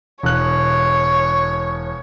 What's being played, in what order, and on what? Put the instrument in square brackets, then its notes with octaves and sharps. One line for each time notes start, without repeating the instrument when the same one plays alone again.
[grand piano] E1 F#6 [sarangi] C#5